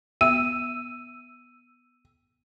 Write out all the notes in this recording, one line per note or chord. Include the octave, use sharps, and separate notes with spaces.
B3 E5 E6 D#7